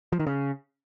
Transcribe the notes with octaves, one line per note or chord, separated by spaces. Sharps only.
F3
D#3
C#3